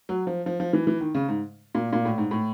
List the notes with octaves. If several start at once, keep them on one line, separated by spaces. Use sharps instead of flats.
F#3
F3
F3
F3
E3
E3
D#3
C#3
G#2
A#2
A#2
A2
G#2
A2